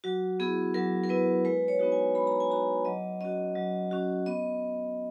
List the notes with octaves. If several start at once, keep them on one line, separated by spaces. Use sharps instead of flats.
F#3 F#4
B3 E4 G#4
F#3 A#4
A#4
B3 E4 B4
G#3 B4
C#5
B3 D#4 F#4
G#5
G#3 B5
A#5
G#5
B3 D#4 F#4 A#5
F#3 D#5
C#4 F#4 D#5
F#3
C#4 F#4
B3 D#5